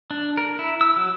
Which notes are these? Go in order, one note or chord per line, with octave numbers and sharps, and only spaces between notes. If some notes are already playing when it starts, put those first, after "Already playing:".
D4
A#4
E4
E6
F#3